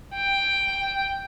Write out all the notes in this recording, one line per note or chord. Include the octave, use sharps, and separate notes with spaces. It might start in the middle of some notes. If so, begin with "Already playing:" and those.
G5